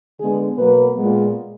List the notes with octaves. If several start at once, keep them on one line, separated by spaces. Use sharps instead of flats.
D3 G#3 B3 G#4
B2 F#3 A#3 B4
A#2 G#3 B3